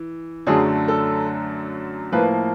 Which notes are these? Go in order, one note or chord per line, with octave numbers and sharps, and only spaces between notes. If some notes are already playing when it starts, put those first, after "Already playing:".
Already playing: E3
F#2 D3 F#3 A3 G#4
A4
A2 F3 A#3 B4